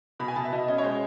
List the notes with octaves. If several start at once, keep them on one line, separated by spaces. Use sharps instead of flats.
B2 B5
G#5
B2 A5
E5
B2 D#5
C#4 D#5
C#5
G#3 C5